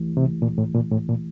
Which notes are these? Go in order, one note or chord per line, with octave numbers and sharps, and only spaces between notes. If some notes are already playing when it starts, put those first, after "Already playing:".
Already playing: E3 A3 E4 G4
C3
A#2
A2
A#2
A2
A#2